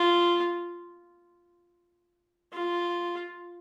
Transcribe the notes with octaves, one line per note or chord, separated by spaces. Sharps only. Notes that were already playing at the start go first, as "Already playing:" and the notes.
Already playing: F4
F4